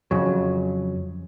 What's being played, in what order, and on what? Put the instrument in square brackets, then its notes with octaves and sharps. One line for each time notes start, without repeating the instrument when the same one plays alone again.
[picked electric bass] F2 C#3 F#3